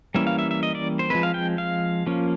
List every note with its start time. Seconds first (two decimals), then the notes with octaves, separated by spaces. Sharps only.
0.15 E3 G3 A#3 C#4 E5
0.27 F5
0.39 E5
0.51 E5
0.63 D#5
0.75 D5
0.99 C5
1.10 F3 G#3 C4 B4
1.23 F5
1.34 G5
1.58 F5
2.06 F3 A#3 C#4